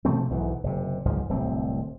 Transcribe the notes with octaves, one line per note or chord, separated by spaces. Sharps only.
B2 F3 A3 C4
B1 E2 G#2 E3
F#1 C3
F#1 C#2 G#2 F3
D1 C2 C4